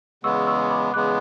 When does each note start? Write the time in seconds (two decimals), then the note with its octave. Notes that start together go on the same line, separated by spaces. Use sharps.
0.24 E2 C#3 G#3 B3 C#6 E6
0.47 C#6 E6
0.70 B5 D6
0.94 E2 C#3 G#3 B3 D6 F#6